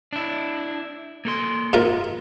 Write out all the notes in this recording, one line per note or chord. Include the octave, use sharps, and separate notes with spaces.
D4 E4
A#3 A4 C6
G#2 F4 A#4